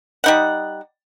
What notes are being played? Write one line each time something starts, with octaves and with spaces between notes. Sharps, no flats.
G3 D#4 F#5